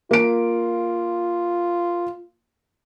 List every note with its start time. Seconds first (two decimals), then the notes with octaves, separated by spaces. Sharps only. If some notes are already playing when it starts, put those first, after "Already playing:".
0.11 A#3 F4 D7